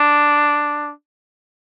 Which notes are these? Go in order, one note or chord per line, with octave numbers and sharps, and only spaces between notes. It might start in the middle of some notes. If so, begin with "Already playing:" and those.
Already playing: D4